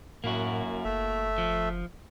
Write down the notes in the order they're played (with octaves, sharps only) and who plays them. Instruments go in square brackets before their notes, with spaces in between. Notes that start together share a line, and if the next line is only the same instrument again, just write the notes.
[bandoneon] F#2 [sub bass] A2 [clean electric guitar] A#3 E4 F#4
[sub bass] F#1 [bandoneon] A3 E5
[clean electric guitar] F3